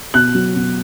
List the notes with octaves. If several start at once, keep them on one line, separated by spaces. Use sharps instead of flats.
B2 F#6
F#3
B2